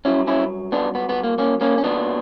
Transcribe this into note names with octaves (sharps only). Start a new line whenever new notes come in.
G2 F#3 C#4 E4
C#4 E4
B3 D4
B3
B3
A#3
A#3 C#4
A#3 C#4
C#4
B1 A#2 F#3 B3 D4